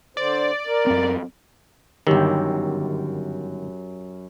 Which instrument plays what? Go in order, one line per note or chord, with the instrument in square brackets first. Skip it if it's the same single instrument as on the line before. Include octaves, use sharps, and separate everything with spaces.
[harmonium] D3 C5 [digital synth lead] D5
[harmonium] A#4
[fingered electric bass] F#2 C4
[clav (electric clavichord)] G1 D#3 [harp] F#2 G4 E6